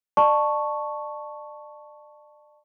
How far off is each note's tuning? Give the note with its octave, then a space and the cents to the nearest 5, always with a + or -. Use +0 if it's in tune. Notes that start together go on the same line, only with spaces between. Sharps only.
D5 +30 A5 +0 C#6 +0